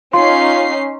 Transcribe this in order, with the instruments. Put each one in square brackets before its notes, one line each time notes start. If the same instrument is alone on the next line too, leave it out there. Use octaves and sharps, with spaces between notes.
[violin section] C#4 D#4 C7 [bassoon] F4 [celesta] C6